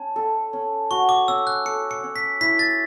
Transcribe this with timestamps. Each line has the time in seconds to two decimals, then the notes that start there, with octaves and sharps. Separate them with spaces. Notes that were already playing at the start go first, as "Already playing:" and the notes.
Already playing: C#4 A5
0.16 A4
0.53 C#4
0.91 F#4 C#6
1.09 D6
1.28 C#4 E6
1.47 F#6
1.65 A4 C#7
1.91 C#7
2.03 C#4
2.16 B6
2.41 E4 B6
2.59 A6